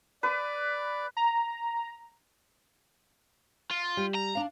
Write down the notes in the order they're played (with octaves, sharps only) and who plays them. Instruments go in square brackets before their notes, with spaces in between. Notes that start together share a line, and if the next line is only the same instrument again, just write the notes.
[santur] B4 [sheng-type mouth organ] D5
[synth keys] A#5
[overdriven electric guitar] F4
[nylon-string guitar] G3
[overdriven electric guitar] A#5
[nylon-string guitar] D4 F5